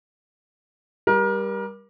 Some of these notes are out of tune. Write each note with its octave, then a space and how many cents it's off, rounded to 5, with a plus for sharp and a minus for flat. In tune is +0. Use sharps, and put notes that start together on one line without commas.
G3 +10 A#4 +30